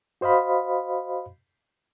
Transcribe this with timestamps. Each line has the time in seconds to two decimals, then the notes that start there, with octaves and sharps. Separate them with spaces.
0.21 F#4 C5 D#5 F5 B5